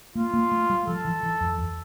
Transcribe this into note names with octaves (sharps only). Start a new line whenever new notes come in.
A#3 F4
A#3
A3
G3
F3 A4
E3
E3
F2
E2